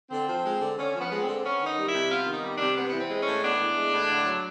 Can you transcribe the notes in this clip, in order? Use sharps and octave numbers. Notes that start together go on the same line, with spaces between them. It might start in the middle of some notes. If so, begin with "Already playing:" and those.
D3 C4
F3
G#3
D3
D3 C#4
F3
B3
G#3
C4
D3
B3 C#4
D#3
D#4
G3
E4
C3
B3 F4
D#3
D#4
G3
D4
C3
B3
E3 B3
C4
G#3
C#4
A2
B3 D4
E3
G#3
A2
D3
F#3